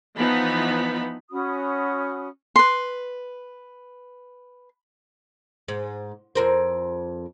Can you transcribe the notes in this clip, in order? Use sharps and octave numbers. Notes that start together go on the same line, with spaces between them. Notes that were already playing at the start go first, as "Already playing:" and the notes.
E3 F3 B3 D#4 B5
C#4 F#4 B5 D#6
B4 C6
G#2
F2 A#4 C5